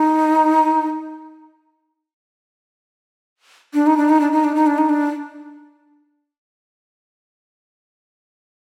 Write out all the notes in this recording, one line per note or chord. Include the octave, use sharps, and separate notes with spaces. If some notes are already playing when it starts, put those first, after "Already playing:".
Already playing: D#4
D4
D#4
D4
D#4
D4
D#4
D4
D#4
D4
D#4
D4